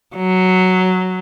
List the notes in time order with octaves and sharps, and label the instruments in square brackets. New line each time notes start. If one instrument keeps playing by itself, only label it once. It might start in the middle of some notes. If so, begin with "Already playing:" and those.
[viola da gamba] F#3